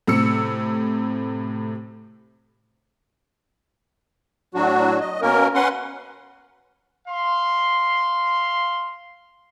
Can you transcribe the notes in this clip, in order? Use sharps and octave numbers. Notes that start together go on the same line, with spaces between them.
A2 C3 E6 C#7
A2 F#3 D4 F#4
D#5
B2 A#3 C#4 A#4
C#4 B4 F#5 C6
F5 C6